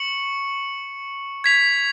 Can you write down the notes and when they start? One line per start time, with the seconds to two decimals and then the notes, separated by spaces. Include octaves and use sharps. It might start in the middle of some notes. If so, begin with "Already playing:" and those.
Already playing: C#6 C#7 F#7
1.44 G#6 B6 F7